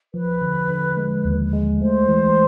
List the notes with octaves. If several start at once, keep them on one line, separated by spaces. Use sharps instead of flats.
F3 B4
D3
D3
G#3
D#2
G#3
A3 C5
E3